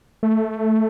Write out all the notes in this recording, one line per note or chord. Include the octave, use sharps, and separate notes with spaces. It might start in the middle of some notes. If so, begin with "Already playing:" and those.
A3